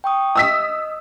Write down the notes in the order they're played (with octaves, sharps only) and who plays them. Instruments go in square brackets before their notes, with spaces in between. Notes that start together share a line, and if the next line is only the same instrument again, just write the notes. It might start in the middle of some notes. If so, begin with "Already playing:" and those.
[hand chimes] G5 C#6 D#6
[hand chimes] D#5 [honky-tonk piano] D#6 E6 B6